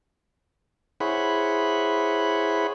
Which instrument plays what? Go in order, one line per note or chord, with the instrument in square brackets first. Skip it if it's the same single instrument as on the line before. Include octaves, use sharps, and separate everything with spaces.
[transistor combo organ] E4 G#4 C5 C#5 F#5 B5